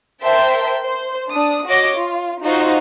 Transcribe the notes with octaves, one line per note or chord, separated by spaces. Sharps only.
A#4 C5 E5 G5 A5
C5
D4 D#6
F#4 C#5 D#5 D6 A#6
F4
D#4 F4 F#4 C5